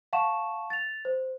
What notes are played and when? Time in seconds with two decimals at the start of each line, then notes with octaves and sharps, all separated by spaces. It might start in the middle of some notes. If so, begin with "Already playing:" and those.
0.13 F5 F#5 A5 C#6 E7
0.70 A6 F7
1.05 C5